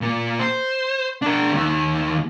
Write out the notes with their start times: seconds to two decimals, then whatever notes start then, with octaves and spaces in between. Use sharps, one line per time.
0.01 A#2 A#3
0.39 C5
1.22 D4 A#4
1.52 D#2 D#3